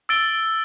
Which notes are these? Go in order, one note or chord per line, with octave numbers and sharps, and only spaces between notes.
E6 A6 D7 G7